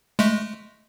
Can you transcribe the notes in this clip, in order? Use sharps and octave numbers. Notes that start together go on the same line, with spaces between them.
G#3 A3